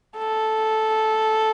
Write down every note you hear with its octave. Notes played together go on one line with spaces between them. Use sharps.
A4